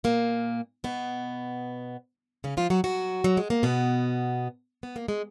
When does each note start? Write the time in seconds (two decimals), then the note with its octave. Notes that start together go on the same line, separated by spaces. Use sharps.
0.04 A#2 A#3
0.84 B2 B3
2.44 C#3 C#4
2.57 F3 F4
2.70 F#3 F#4
2.84 F#3 F#4
3.24 F#3
3.37 G#3
3.50 A#3
3.63 B2 B3
4.83 B3
4.96 A#3
5.08 G#3